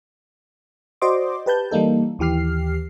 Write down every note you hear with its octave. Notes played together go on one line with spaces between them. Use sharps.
F#4 C5 D5 D#5 C6 D6
G4 B4 A5 G6
E3 G3 A#3 D#4 A4
D#2 E3 G4 F6 C7